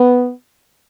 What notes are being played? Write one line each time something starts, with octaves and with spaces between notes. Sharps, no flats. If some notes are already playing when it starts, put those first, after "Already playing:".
Already playing: B3